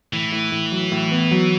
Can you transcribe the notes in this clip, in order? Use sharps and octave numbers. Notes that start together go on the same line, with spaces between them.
A2 E3
A2
A2
F#3
A2
B3
F#3